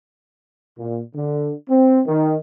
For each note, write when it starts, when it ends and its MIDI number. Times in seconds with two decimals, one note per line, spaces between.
0.77 1.00 46
1.15 1.52 50
1.68 2.00 60
2.05 2.35 51